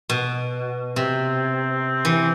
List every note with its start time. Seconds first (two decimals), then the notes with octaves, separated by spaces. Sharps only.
0.10 B2
0.96 C3 C4
2.05 E3